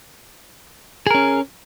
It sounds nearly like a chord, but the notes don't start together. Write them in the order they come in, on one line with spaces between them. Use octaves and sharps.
G#4 A#4 C#4